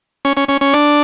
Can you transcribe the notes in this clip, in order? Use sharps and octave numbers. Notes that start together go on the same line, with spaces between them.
C#4
C#4
C#4
C#4
D4